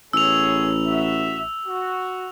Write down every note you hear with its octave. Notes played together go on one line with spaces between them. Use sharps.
A1 B3 G#4 C#5 E6 F7
F#4 E5
F#4